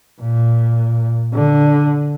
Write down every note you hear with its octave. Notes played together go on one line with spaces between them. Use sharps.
A#2
D3